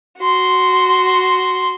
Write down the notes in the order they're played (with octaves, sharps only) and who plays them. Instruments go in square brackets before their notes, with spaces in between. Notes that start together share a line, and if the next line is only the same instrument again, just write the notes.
[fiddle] F#4 C6